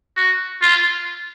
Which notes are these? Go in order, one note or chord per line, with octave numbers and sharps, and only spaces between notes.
F#4
F4